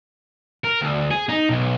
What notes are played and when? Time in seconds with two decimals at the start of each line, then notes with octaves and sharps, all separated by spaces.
0.64 A#4
0.81 D2
1.11 G#4
1.29 D#4
1.50 B1